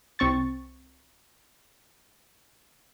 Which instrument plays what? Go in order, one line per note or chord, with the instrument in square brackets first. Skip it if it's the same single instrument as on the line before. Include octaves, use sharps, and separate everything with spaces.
[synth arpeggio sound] C2 C4 C#6 A6